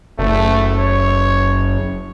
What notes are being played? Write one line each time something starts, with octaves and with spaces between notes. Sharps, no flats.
F#1 A3
C#5